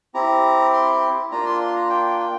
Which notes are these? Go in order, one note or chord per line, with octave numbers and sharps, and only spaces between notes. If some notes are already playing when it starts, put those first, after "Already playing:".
C4 E4 G4 A#5
C6
C6
A#3 D4 F4 A#5
C6
C6
A#5
G5
G5